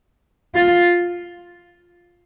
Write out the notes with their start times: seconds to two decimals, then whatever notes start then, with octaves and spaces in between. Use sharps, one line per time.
0.55 F4